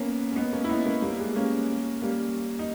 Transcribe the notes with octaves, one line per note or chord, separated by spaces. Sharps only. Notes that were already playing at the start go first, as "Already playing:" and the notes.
Already playing: A#3 B3 C#4
C#4
B3 D#4
A#3 C#4
E4
B3 D#4
A#3 C#4
G3 A#3
G#3 B3
A#3 C#4
G3 A#3
D#4